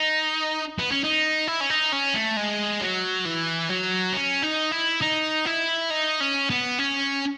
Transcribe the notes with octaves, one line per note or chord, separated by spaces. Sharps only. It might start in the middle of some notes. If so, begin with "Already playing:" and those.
Already playing: D#4
B3
C#4
D#4
E4
C#4
D#4
C#4
A3
G#3
F#3
E3
F#3
C#4
D#4
E4
D#4
E4
D#4
C#4
B3
C#4